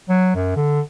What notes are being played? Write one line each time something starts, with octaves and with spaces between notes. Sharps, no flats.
F#3
F#2
D3